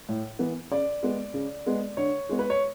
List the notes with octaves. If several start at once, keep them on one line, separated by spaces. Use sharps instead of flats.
A2
E3 B3
C#3 D5
G#3 B3
C#3
G#3 B3
D3 C#5
G#3 B3
B4
C#5